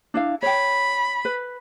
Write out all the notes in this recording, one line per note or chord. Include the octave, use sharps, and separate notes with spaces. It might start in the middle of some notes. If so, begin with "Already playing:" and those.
D4 E4 F5
C#5 G5 B5
B4